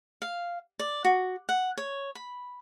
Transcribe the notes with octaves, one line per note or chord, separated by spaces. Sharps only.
F5
D5
F#4
F#5
C#5
B5